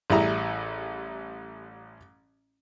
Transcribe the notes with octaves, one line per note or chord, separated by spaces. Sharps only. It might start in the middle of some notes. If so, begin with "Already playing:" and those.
A1 G3 E4 G#4 A#5